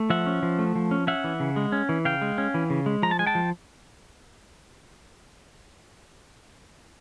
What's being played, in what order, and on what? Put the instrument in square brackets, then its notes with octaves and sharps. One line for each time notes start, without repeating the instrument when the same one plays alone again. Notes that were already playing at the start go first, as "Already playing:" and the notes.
Already playing: [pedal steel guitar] A3
F3 E5 F#5
C#4
F3
A3
F3
C#4
C#4 E5 F#5
E3
C#3
G#3
C#4
E3
C#3 F5 G5
G#3
C#4
E3
C#3
G#3
F3 A#5
A5
G#3 G#5
G5 A5
F3